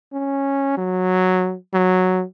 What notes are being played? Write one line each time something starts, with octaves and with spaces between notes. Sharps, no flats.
C#4
F#3
F#3